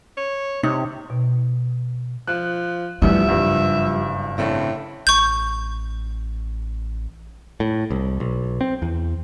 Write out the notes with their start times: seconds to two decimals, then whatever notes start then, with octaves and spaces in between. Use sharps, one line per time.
0.17 C#5
0.63 C3 D#4 C#5
1.10 B2
2.28 F3 F#6
3.02 A1 E2 E3 F3 G3 E5
3.28 F#1 G2
4.38 A2 C#3 C4 D4
5.07 A1 C#6 G6
7.60 A2
7.91 C2
8.20 B1
8.61 C4
8.82 E2